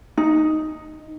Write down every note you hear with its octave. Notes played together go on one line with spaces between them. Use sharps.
D#4